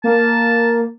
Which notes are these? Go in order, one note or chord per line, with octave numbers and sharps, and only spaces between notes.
A#3 A5